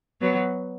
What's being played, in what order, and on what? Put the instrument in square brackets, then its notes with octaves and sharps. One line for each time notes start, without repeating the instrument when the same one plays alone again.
[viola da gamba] F#3 B3